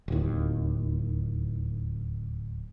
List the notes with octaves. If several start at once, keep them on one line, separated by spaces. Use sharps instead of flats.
D1 D#2